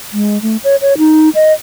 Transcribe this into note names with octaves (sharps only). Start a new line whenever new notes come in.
G#3
A3
C#5
C#5
D#4
D#5